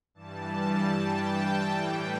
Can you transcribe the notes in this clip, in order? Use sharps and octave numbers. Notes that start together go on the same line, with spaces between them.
G2 E3 G3 A5
G5
A5
A2 E3 G3 G5